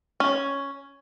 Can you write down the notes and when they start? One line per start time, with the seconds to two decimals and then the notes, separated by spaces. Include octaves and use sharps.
0.20 C#4